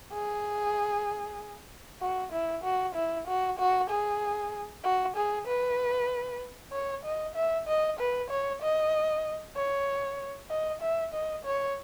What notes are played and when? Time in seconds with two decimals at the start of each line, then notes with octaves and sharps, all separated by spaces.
0.12 G#4
2.01 F#4
2.32 E4
2.64 F#4
2.95 E4
3.27 F#4
3.59 F#4
3.89 G#4
4.84 F#4
5.16 G#4
5.47 B4
6.72 C#5
7.05 D#5
7.35 E5
7.68 D#5
7.99 B4
8.30 C#5
8.62 D#5
9.56 C#5
10.50 D#5
10.81 E5
11.14 D#5
11.45 C#5